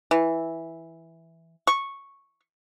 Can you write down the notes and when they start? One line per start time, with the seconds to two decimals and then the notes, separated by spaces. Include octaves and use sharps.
0.11 E3
1.67 C#6